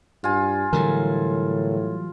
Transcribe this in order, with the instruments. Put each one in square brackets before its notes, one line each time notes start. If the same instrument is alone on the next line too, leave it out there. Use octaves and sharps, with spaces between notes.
[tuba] G2 [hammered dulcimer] F4 G#5
[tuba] A2 [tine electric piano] D3 A#4 [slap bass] E3 F#3 G3